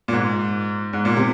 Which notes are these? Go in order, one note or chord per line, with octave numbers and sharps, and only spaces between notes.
A#2
G#2
G#2
A#2
C3